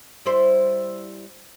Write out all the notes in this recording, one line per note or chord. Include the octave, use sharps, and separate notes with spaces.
G3 E4 C5